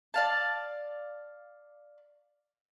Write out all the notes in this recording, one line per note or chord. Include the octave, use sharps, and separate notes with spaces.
D5 F5 A5